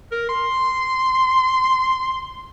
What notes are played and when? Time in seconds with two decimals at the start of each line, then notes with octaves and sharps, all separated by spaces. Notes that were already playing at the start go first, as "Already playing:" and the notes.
0.12 A#4
0.29 C6